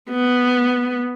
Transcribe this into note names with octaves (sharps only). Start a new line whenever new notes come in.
B3